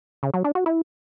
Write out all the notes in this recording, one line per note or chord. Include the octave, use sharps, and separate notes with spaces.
C#3
F#3
D4
F#4
E4